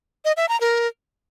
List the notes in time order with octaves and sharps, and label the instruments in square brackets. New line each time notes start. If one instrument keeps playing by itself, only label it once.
[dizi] D#5
E5
A#5
A#4